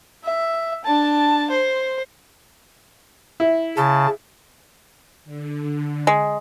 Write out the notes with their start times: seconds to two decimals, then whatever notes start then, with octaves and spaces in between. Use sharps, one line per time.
0.24 E5
0.85 D4 A5
1.50 C5
3.40 E4
3.77 C#3 A5
5.25 D3
6.07 G#3